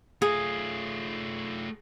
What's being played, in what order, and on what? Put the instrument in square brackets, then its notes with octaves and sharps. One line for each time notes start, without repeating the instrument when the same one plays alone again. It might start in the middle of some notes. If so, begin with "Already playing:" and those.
[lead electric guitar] A3 F4 [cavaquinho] G#4